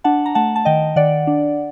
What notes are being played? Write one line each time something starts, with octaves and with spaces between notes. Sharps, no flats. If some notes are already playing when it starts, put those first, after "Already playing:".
D4 F#5 A5
A#5
A3 F#5 A5
A5
D#3 D#5 G5
D#3 D5 F#5
D4